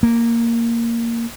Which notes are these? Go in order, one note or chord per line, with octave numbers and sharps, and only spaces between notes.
A#3